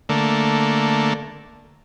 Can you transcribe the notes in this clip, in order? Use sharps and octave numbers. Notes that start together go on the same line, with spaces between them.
D3 A3 A#3